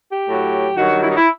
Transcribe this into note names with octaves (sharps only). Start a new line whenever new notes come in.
G4
A2 F#3
G2 D#3 F#3 F#4
E4
D#4
E4